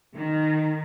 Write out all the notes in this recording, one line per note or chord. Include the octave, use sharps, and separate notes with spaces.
D#3